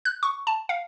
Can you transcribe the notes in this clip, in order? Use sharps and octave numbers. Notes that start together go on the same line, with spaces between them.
F#6
C#6
A5
F5